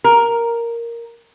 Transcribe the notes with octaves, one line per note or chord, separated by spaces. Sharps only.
A#4